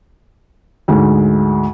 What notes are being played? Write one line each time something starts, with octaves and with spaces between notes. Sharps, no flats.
D2 G#2 G#3